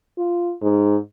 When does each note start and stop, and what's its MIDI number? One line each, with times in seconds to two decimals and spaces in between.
0.18 0.53 65
0.62 0.97 44